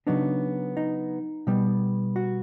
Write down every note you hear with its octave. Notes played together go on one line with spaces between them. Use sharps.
C#3 F#3 B3 D4 D#4
D#4
B2 G3 B3
F#4